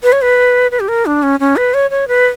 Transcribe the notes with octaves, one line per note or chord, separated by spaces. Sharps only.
B4
C#5
B4
B4
G4
A#4
D4
C#4
C#4
B4
C#5
C#5
B4